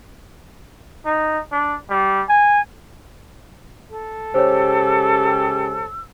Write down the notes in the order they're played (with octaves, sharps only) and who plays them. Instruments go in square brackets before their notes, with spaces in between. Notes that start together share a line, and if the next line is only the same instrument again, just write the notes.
[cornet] D#4
D4
G3
G#5
[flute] A4
[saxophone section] C#3 G#3 G4 [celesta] C5 C#5 [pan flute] E6